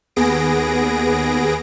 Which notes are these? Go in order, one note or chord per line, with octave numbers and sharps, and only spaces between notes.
D#2 B3 G#4 A#6 D7